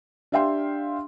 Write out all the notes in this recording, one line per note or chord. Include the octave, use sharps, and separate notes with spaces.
D4 G4 E5 F5 G5 C6